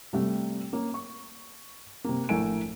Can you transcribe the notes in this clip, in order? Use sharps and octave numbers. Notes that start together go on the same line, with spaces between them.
C3 G3 A3
A#3 C#4
C#6
C3 A#3
A#1 A2 A3 A#4 G#5 D7